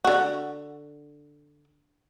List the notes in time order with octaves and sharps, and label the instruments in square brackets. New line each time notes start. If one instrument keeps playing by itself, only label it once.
[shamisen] D3 F#4